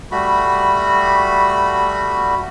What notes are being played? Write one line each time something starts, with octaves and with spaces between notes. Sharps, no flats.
G3 A3 F#4 B5